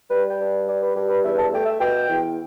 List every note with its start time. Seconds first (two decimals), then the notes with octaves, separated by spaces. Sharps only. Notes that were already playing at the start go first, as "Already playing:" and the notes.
0.09 G3 B4
0.28 G5
0.38 G2
0.66 G3 D5
0.81 B4
0.95 G2 G4
1.09 B4
1.23 E2 E5
1.37 A5
1.52 A3 G5
1.65 E5
1.79 B2 G5
2.08 E2